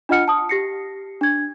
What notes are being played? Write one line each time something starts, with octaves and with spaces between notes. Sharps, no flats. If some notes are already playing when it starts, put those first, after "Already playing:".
D4 F4 D#5 F#5 F6 C#7
A5 D#6
G4 A#6 C7 C#7
D4 G#6